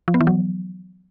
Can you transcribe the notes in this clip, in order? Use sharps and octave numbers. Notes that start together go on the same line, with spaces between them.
F3
B3
E3
F#3